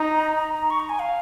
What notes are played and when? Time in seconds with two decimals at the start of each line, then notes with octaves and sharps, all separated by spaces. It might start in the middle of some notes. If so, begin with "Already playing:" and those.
Already playing: D#4 A#5
0.70 C#6
0.80 A#5
0.89 G#5
0.99 F5